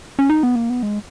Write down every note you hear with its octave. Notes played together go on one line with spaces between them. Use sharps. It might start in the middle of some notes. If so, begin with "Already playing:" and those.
C#4
D#4
B3
A#3
B3
G#3